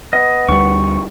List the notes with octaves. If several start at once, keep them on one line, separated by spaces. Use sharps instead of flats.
B3 D#5
D2 G3 C#6